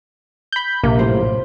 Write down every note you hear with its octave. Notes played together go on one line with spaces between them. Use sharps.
B5 G6
A#1 C3 A#3
F#2 A2 C4 F4 C5